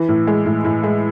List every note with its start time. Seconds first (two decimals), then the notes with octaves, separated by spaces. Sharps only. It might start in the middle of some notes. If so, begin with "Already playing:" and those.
Already playing: E3
0.08 A2
0.27 G#3
0.46 A2
0.64 A2
0.83 G#3